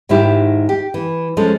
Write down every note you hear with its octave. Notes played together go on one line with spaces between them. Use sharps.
G#2 D#3 D#4 E4 G4
G4
E3
F3 G#3 C#4 A4